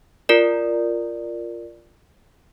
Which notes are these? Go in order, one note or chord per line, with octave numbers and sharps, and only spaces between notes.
F4 A#4 D5